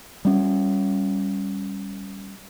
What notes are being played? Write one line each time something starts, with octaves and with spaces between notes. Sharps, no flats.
G3 C#4